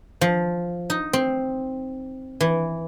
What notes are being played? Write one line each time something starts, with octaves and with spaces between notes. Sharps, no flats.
F3
D#4
C4
E3